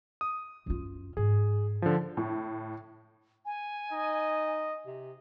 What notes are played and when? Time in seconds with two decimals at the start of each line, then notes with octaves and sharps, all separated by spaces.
0.21 D#6
0.66 F#2 F4
1.17 G#2 G#4
1.82 D3 F3
2.17 A2
3.45 G#5
3.92 D#4 D#5
4.86 C3